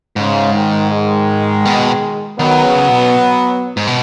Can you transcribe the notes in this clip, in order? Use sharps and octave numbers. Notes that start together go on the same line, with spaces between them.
G#2 C#3
D#3
D#3 G#3
B2
D#3 F#3 B3
C#3
B2
G#2
B2